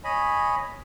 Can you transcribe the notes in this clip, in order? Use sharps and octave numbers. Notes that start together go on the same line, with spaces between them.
C#5 D#5 G#5 B5